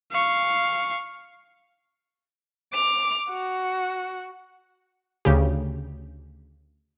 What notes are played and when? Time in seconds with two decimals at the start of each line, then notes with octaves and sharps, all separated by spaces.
0.12 F5 C#6
2.73 D6 F7
3.29 F#4
5.25 D2 C#3 G4